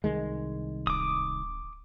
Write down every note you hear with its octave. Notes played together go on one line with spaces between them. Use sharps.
C2 D#3 G#3
D1 D6 D#6